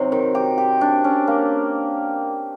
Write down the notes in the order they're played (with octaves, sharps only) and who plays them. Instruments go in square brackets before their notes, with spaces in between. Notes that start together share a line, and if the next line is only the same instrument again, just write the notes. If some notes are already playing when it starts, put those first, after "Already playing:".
Already playing: [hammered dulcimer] C3 F#3 D#4
D#3
G4
G4
D4
C#4
A#3